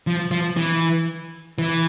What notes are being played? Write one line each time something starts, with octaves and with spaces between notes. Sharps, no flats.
F3
F3
E3
E3